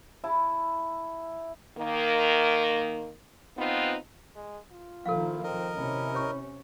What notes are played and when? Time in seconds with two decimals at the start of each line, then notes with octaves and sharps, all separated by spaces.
0.24 E4 A5
1.78 D#3 A#3
3.57 B3 C4 D#4 F4 B4
4.36 G#3
4.72 F4
5.06 D#3 F3 A#3 E4 A4 F5
5.43 C4 A#4 D#5
5.78 C3 C#4 E4
6.15 C#5 C#6